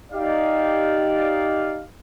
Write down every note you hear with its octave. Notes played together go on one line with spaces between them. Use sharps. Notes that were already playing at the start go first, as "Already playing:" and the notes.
D#4 G4 D5 F5